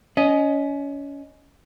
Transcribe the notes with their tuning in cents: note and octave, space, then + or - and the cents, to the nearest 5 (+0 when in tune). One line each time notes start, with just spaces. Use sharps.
C#4 +25 D#5 +0